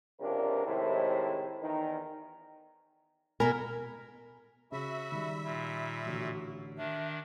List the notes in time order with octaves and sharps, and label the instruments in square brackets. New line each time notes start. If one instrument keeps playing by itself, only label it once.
[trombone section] C#2 C3 F3 D4 A#4
A2 C3 D#3 G#3 E4 C5
E2 D#3 D#4
[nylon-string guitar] B2 A#4 [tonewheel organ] G#5 B5 F6
[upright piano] C#3 [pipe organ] F#4 [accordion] E5 [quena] B5
[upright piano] D#3 G3
[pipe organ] A#2 [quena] B5
[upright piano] A1 D3 [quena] F#4
[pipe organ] D#3 D4 [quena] E5